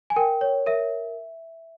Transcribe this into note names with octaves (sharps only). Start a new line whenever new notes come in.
G#5
A#4 G5
C#5
A#4 E5